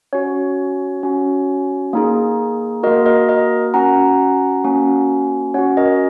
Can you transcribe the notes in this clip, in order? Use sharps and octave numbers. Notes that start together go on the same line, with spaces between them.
C#4 F#4 C#5
C#4 F#4
A#3 D#4 G#4
A#3 F#4 A#4 D#5
A#4 D#5
A#4 D#5
C#4 F#4 F#5 A#5
A#3 C#4 F#4
C#4 F#4 C#5 F#5
A#4 D#5